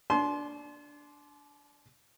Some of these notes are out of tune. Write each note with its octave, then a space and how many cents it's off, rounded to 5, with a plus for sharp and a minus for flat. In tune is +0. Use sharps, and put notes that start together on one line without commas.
D4 -5 A5 -45 C6 +0